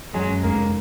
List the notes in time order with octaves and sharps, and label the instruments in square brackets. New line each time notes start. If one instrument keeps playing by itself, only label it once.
[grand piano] F#2 [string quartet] F#3 G#3
[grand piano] F#2
[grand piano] F1 [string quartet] G#3 A#3